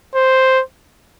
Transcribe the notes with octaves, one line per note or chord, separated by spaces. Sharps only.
C5